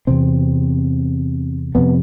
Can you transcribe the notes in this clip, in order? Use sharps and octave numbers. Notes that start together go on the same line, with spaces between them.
E2 C3 C4
F2 C3 B3